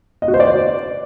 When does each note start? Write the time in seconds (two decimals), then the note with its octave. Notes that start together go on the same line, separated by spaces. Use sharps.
0.22 D#5
0.28 F#4
0.34 C5
0.40 D5